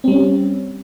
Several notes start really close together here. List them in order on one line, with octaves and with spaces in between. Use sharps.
C4 G3 C#4